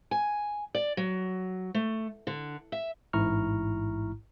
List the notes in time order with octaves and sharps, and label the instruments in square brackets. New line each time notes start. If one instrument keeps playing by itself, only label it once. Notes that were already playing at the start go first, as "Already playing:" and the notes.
[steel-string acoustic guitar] G#5
D5
F#3
A3
D3
E5
[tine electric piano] A1 G#2 E4 A#5 C#6 F6